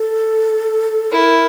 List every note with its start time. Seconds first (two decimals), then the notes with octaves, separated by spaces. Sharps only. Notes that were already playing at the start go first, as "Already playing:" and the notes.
Already playing: A4
1.11 E4 A#4